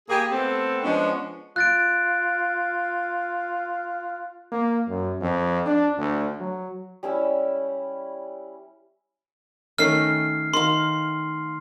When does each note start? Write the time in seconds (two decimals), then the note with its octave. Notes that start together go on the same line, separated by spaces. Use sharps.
0.09 A#3 G4 G#4
0.31 A3 B3 C4 A4
0.83 F3 G#3 B3 C#4 D4
1.56 F4 F#6 A6 D7
4.52 A#3
4.88 F#2
5.21 F2
5.66 D4
5.98 D2
6.40 F#3
7.03 G3 C#4 E4 E6
9.78 D#3 A3 C#4 F6 C7
10.54 D#3 F5 C6